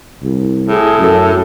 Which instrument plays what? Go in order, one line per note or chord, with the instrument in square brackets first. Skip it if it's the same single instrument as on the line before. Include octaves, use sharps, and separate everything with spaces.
[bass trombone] C2
[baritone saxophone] A2 [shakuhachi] G#4
[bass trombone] F#2 [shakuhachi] A4